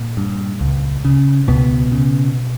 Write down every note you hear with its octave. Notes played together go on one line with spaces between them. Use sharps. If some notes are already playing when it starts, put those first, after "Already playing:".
Already playing: A#2
G2
C#2
C#3
C#2 B2 B3
C#3